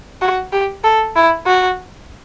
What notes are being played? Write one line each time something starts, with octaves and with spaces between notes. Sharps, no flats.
F#4
G4
A4
E4
F#4